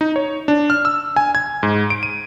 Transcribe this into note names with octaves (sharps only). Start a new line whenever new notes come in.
D#4
C#5
D4
F6
E6
G#5
G#6
G#2
D7
D#7